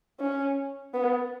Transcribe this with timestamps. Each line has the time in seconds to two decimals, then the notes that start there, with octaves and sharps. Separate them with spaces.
0.20 C#4
0.94 B3